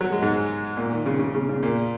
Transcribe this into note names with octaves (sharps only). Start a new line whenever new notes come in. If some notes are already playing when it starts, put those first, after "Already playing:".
F#3
G#3
G#2
A#2
D#3
C#3
C#3
C#3
C#3
A#2